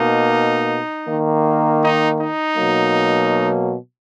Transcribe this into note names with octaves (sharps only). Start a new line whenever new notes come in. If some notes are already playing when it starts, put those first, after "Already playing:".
Already playing: B2 A#3 D#4
D#3 A#3
D#4
D#4
B2 F#3 A#3